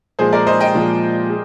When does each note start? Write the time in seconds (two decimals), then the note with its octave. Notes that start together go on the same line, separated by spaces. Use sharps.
0.19 A#2 F3 G#3 G#4 C5
0.33 A#4 D5
0.47 C5 D#5
0.60 D#5 G5
0.75 A#2 F3 G#3
1.29 G#4